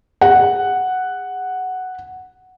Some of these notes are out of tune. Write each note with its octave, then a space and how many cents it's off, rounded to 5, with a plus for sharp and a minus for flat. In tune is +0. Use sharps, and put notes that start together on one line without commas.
G#4 -35 F#5 +0